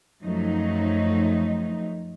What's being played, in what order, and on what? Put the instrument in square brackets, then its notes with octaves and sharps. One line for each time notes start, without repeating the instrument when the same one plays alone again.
[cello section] F#2 F3 F#3 A3 D#4